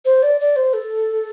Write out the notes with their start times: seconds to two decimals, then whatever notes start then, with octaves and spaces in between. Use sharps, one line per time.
0.05 C5
0.23 D5
0.40 D5
0.56 C5
0.73 A4